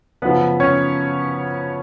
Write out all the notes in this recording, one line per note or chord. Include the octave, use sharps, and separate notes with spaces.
F#2 C#3 F3 B3 B4
C#4 C#5